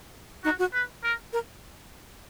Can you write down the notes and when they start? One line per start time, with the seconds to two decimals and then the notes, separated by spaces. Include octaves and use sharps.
0.45 D#4 F#4
0.59 F#4
0.74 B4
1.04 A#4
1.33 A#4